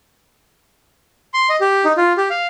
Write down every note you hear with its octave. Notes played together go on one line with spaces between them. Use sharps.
C6
D#5
G4
D#4
F4
G4
F5